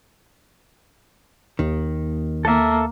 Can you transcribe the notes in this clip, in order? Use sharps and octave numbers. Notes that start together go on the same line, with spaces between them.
D#2 D#3
A#3 A4 E5